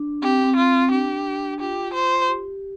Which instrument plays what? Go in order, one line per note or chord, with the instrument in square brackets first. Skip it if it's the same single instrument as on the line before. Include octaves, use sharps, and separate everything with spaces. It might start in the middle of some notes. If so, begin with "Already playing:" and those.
Already playing: [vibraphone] D4
[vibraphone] C4 [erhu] G4
[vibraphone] C4
[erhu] F4
[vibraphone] D4 [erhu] G4
[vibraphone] F4 [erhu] G4
[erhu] C5
[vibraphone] G4